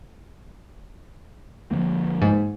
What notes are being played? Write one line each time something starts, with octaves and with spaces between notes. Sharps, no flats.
D3 F3 A#3
G#2